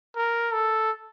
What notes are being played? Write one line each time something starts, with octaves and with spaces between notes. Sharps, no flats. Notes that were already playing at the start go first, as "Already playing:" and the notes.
A#4
A4